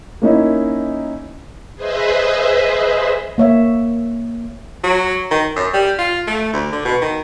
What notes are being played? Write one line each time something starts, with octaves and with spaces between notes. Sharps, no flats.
A#3 C#4 D#4 E4
G#4 B4 C5 D#5 E5
A#3 C#5 E5
F#3
D#3
F#2
G3
F4
A3
D2
D3
B2
D#3